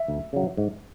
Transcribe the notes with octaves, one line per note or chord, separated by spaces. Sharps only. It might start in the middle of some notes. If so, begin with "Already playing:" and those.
Already playing: E5
D2
C#3 F#3
G#2